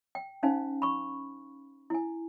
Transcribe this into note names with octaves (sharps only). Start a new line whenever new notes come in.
G5
C#4 D#4 C5 F5 G#5
B5 C#6
E4 G#5